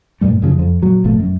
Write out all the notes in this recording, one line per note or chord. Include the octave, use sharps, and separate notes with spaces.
G2 A#2 G3 A3
F#2 C#3 F3
F2
A#2 F#3
G1 A#2 F3 A3
F#2